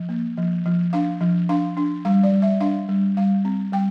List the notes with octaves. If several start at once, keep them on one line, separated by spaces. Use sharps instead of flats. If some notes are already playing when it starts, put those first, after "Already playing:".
Already playing: F3
A#3
F3
F3
D4 F5
F3
D4 F5
D4
G3 F5
D5
G3
E5
D4 F5
G3
G3 F5
C4
G3 G5